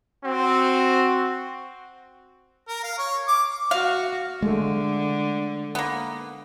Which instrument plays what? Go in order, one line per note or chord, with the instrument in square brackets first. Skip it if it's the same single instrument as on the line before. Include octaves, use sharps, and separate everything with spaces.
[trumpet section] C4 F#4
[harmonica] A#4
F5
C#5
D6
[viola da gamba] F#4 [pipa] F5
[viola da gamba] D3 [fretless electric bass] G#3 A3
[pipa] A#3 B3